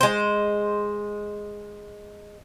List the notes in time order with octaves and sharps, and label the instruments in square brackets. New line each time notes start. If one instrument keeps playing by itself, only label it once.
[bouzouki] G#3 C5